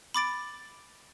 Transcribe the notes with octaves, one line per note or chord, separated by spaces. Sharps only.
B5 D6 A6 D7